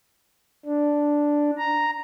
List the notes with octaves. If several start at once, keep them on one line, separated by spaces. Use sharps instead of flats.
D4
A#5